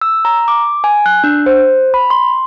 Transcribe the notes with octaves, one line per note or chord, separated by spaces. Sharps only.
E6
A#5
D6
G#5
F#6
D4
C5
B5
C6